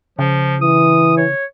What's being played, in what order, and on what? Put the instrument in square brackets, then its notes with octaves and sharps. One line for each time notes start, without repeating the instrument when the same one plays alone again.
[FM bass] C#3 [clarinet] F3
[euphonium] E3 [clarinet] D#6
[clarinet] C#5